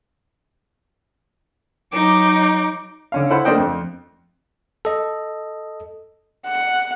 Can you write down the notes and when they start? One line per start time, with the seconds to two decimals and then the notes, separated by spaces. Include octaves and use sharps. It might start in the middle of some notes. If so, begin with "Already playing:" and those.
1.93 F#3 D#4 D6
3.12 D3 C#4 F5
3.30 E4 A4 C5 F#5 B5 C6
3.45 A3 A#3 D4 C5 D#5 G5
3.58 F2
4.85 A4 D#5
6.47 F#5